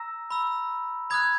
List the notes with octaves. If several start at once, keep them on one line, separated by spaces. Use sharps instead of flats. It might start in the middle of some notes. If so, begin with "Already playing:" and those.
Already playing: A#5 E6 A#6
B5 E6
B5 D#6 F#6 G#6